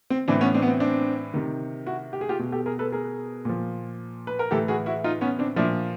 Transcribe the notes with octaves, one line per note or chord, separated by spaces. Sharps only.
C4
A2 E3 C4 D4
B3 C#4
C4 D4
B3
C4
C4 D4
C3 D#3
E4 F#4
G4
G#4
F4 G4
B2
G4 A4
G#4 A#4
A4 B4
G#4 A#4
A#2 F3
B4
A#4
A2 E3 G4 A4
F#4 G#4
E4 F#4
D#4 F4
B3 C#4
C4 D4
A#2 F3 D4 E4